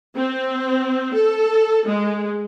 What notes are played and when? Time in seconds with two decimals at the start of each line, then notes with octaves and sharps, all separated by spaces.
0.15 C4
1.13 A4
1.87 G#3